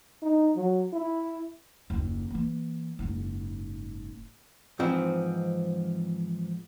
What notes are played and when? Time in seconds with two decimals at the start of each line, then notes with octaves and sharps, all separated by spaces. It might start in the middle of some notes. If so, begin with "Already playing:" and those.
0.22 D#4
0.56 F#3
0.93 E4
1.90 F#1 D#2
2.30 E3 A#3
2.99 F#1 G#2
4.79 G#2 E3 F3 C4 D#4